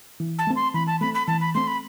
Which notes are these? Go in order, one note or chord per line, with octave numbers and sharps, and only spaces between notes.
E3
A5
A3 C4
C6
E3 B5
A5
A3 C4 B5
B5
E3 A5
B5
A3 C4 C6
B5